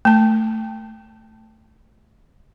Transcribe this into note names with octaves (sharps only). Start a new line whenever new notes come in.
A3 A5